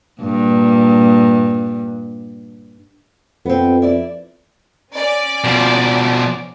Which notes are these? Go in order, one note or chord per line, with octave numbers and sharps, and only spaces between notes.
G2 A#2
F2 B3 C4
E4 D5
C#4 D5
B2 F3